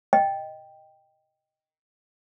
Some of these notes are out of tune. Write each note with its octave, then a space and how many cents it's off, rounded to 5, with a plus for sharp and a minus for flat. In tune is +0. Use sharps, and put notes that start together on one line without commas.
D#5 +0 G5 +0